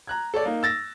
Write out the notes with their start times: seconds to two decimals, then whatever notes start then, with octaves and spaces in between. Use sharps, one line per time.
0.07 A#5 F#6 G#6
0.34 A4 C#5 D5
0.45 A#3 D#4
0.63 E6 A6 A#6